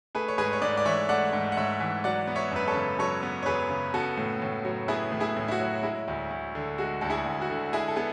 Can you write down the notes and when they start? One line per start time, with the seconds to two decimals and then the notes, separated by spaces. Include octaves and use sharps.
0.15 A3 G#4 B4
0.28 C#5
0.38 G#2 G#4 B4
0.53 C#5
0.62 G#2 B4 D5
0.77 D5
0.85 E3 C#5 E5
1.09 A3 D5 F#5
1.33 G#2
1.52 F#5
1.57 G#2 C#5 E5
1.80 E3
2.04 F#3 D5 F#5
2.27 B3
2.35 C#5 E5
2.51 F#2 B4
2.67 A4 C#5
2.75 C#3
2.99 F#3 A4 C#5
3.23 B3
3.43 C#5
3.46 F#2 G#4 B4
3.70 C#3
3.94 B3 F#4 A4
4.18 A2
4.42 A2
4.65 F#3
4.88 B3 E4 G#4
5.12 A2
5.20 E4 G#4
5.37 A2
5.48 E4
5.51 F#4
5.60 F#3
5.83 G#3 E4
6.08 D2
6.31 D2
6.55 D3
6.78 G#3 F#4
7.01 D2 A4
7.10 E4 G#4
7.26 D2
7.42 F#4
7.50 D3
7.73 G#3 E4 G#4
7.88 A4
7.96 B3 G#4